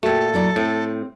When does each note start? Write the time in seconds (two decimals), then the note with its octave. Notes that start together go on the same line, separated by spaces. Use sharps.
0.03 A#2 A3 F#4 G4 A4
0.34 F#3 E4 D5
0.56 A2 C4